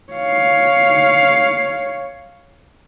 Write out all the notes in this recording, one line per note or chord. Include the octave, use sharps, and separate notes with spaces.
C#5 F5